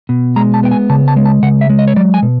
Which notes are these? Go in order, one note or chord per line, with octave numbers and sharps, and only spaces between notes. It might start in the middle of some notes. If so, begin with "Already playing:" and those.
B2
G#3 A#5
A5
B3 G5
G#5
C#3 A5
A5
G#3
A5
C#3 F#5
E5
G#3
D#5
C#5
F#3 D5
G#5
B2